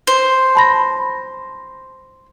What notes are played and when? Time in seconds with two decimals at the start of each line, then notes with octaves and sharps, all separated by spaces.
0.07 C5
0.55 A5 B5 A#6